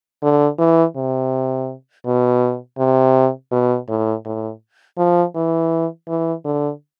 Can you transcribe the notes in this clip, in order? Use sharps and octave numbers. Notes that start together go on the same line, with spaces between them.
D3
E3
C3
B2
C3
B2
A2
A2
F3
E3
E3
D3